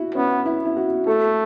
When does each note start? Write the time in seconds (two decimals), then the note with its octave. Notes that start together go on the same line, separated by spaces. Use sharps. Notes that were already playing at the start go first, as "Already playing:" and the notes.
Already playing: E4 F#4
0.15 B3 C#4
0.46 E4
0.65 E4
0.77 F#4
1.07 A3 A4